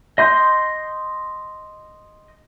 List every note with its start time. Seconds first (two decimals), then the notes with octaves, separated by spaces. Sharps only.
0.18 D#5 C6 G6